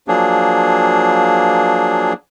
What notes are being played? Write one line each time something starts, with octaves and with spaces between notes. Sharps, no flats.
F3 F#3 A#3 D4 G#4